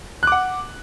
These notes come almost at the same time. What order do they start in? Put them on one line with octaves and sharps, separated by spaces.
F#6 D6 F#5